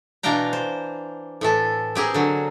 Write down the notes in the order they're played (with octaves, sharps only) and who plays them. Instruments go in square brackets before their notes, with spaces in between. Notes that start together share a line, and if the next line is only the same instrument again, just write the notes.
[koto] B2 E3 D4 F5 G5 A#5
C5
A2 E3 A4
C4 G4 G#4 A#4
D3 F#3